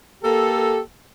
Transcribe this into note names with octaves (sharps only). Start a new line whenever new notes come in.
A#3 G4 A4